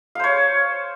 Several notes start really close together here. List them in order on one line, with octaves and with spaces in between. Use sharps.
F5 C5 C#5